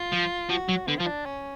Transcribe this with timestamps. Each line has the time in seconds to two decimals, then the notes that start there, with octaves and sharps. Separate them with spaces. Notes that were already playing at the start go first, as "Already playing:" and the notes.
Already playing: F4
0.13 F3
0.50 F3 F#4
0.69 F#3
0.87 D3 B3
0.98 F3 F4
1.06 D4
1.25 C#4